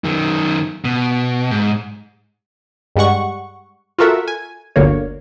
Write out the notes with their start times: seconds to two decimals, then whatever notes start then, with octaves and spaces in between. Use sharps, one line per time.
0.04 F#2 D#3
0.85 B2
1.51 G#2
2.96 G2 G3 G#3 F#5 C#6
3.98 F4 F#4 A4 A#4 E5 F#5
4.28 G#5
4.76 G1 D2 D3 A#3 C#5